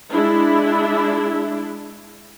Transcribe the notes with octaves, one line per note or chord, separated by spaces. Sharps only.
G#3 D4 E4